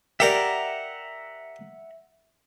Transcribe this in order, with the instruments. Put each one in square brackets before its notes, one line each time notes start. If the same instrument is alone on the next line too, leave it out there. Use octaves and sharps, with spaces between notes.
[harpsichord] G4 A#4 D5 [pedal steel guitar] E5 F#5 A#5